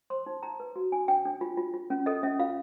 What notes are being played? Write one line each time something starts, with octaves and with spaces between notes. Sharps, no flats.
C5 C6
D#4
D#4 A#5
B4
F#4
D4 G#5
D4 G5
D4
F4
F4
F4
C#4
A4 D#5
C#4 E5
F4 F5